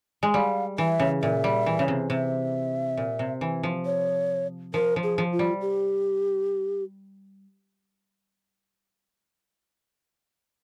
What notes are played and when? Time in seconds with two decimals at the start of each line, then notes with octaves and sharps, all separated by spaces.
0.23 G#3
0.34 G3 F5
0.78 E3 E5
1.00 C#3
1.22 A#2 E5
1.44 G3
1.66 E3
1.79 C#3
1.88 C3
2.10 C3 E5
2.97 A#2
3.19 C3
3.41 E3
3.63 F3
3.86 C#5
4.74 F3 A#4
4.96 F3
5.03 G#4
5.18 F3
5.32 F4
5.39 G3
5.61 G4